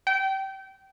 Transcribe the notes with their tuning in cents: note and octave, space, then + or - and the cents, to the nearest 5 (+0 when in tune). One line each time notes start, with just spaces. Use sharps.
G5 -25